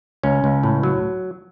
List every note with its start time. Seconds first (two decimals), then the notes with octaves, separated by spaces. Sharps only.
0.23 C#2 C#4
0.44 C#2
0.63 A2
0.83 F#3